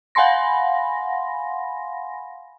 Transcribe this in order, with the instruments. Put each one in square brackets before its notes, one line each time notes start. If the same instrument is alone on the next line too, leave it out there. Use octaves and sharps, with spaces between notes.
[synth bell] F5 F#5 G#5 B5 C6 A#6